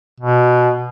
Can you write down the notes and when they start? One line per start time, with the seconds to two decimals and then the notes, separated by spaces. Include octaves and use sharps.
0.20 B2